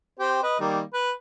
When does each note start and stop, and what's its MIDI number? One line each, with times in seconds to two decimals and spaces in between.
0.19 0.39 60
0.19 0.39 67
0.19 0.39 72
0.43 0.57 71
0.43 0.57 75
0.60 0.81 51
0.60 0.81 55
0.60 0.81 58
0.93 1.11 71